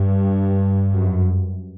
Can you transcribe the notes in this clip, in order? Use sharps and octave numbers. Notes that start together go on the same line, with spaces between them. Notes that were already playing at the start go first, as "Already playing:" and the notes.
Already playing: G2
F#2